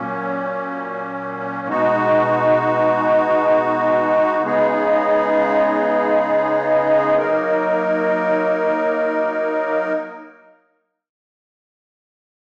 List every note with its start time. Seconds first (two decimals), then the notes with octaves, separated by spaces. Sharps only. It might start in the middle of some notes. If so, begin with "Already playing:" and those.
Already playing: A#2 F#3 A#3 C#4
1.68 B2 G#3 D#4 F#4
4.43 C#3 G#3 B3 D#4 G#4
7.18 F#3 A#3 D#4 A#4